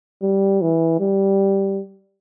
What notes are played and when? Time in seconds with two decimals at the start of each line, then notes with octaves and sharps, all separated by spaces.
0.22 G3
0.62 E3
1.00 G3